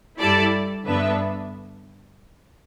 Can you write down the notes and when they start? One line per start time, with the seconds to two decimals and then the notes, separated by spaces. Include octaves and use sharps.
0.19 G2 G3 E4 A4 D5
0.86 G2 D3 B3 D4 B4 E5